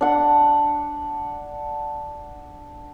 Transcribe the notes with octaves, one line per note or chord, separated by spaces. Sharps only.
D4 F#5